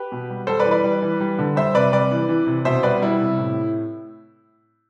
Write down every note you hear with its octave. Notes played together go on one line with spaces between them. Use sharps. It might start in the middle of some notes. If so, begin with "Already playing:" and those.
Already playing: G4 B4
B2
G3
G3 A4 C5
B4 D5
E3
B4 D5
G3
E3
G3
D3
G3 C5 E5
C3 B4 D5
G3 B4 D5
E3
E3
C3
B2 C5 E5
G3 B4 D5
G3 E4
C3
A2